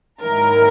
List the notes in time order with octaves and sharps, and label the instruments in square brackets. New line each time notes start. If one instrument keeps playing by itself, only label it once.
[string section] G#2 D#3 F#3 A#3 E4 A#4